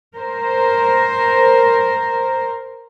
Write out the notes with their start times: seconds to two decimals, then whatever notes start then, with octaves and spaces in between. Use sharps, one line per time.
0.15 A#4 C5